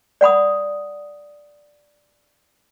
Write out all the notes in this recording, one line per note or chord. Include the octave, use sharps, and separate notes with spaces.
D5 F#5 B5 D#6